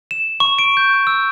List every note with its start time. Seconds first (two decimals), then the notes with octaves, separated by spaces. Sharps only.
0.11 E7
0.40 C#6
0.59 D7
0.77 G6
1.07 E6